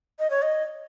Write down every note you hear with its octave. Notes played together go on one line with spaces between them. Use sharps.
D#5
C#5
D#5